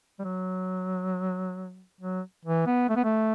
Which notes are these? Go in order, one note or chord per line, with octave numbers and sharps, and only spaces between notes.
G3
F#3
F#3
E3
B3
A3
B3
A3